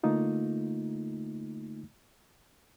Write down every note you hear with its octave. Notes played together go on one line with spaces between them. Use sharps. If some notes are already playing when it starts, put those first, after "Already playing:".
D3 A3 A#3 D#4 F4